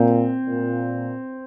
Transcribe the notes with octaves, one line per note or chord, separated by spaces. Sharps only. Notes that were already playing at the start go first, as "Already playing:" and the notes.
Already playing: A#2 C4
A#2